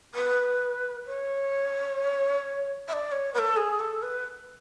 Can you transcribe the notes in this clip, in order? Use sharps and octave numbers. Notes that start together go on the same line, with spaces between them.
B4
C#5
E5
D5
C#5
B4
A4
G#4
A4
B4